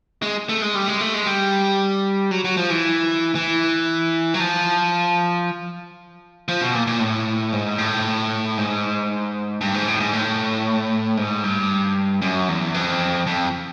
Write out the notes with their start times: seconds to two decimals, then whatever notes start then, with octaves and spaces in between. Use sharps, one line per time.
0.22 G#3
0.49 A3
0.62 G#3
0.75 G3
0.88 G#3
1.01 A3
1.14 G#3
1.26 G3
2.31 F#3
2.45 F#3
2.57 F3
2.70 E3
3.35 E3
4.34 F#3
4.40 F3
6.48 F3
6.61 B2
6.75 A#2
6.87 A#2
7.00 A2
7.52 G#2
7.78 A2
8.58 G#2
9.61 G2
9.74 G#2
9.88 A2
10.00 G#2
10.13 A2
11.17 G#2
11.44 G2
12.22 F#2
12.48 E2
12.74 F2
13.26 F2